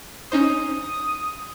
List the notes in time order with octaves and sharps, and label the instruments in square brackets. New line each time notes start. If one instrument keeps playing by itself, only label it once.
[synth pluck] C#4 D#4 C5 [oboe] D#6